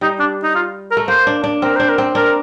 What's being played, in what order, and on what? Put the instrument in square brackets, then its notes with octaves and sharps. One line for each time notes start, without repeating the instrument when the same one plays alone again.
[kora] G3 [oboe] D#4
[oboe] D4
D#4
F4
A#4
[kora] A3
[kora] A#3 [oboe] C5
[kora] D4
D4
[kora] C4 [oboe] A#4
[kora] D4 [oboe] C5
[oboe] A#4
[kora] C4
[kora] D4 [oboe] A#4